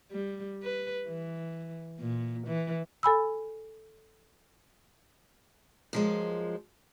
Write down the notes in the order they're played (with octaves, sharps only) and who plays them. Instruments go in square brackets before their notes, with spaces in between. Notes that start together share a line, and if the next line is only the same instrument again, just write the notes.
[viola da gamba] G3
B4
E3
A#2
E3
[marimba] A4 G#5 B5 E6
[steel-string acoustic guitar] F#2 F3 G#3